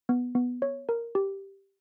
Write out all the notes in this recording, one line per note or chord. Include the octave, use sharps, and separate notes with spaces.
B3
B3
C#5
A#4
G4